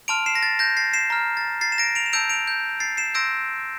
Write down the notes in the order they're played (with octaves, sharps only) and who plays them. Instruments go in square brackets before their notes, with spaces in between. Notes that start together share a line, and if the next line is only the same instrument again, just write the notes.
[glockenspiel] A5 C6 F6 D7 F7
C7 E7
A#6
A6
G6 A#6
A6 C7
C7 E7
A#5 F6
A6
A6 C7
E7
A#6 D7
D7 F7
E7
A5 E6 G6 D7 F7
D7 F7
G6
A6 C7
C7 E7
C6 E6 G6 A#6 D7